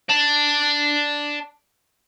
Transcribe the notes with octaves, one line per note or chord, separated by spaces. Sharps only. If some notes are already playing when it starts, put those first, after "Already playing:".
D5 A5